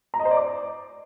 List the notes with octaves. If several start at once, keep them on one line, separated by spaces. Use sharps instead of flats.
A#5
D#5
C5
D5
D6